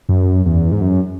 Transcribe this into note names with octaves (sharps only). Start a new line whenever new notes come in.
F#2
E2
G#2
F#2